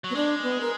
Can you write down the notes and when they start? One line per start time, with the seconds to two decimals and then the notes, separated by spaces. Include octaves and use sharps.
0.04 F#3
0.10 B3
0.15 G#3 D4
0.43 B3
0.61 A#4